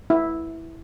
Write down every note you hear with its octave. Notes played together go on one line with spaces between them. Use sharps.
E4